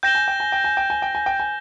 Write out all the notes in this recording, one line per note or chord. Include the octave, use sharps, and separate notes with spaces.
G5 G6 A#6 E7 G7
G#5
G5
G#5
G5
G#5
G5
G#5
G5
G#5
G5
G#5